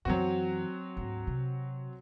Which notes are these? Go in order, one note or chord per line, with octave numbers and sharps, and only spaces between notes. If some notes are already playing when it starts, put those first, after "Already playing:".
F#2 E3 F#3 C4 F#4
D2 G#2
C3